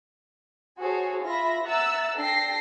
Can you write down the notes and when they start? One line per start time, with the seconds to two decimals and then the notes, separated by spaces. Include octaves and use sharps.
0.79 F#4 G#4 A4 C5 C#5
1.23 F4 E5 B5 A#6
1.64 E5 F#5 A#5 E6 F#6 A6
2.16 D4 A4 G5 A#6 C7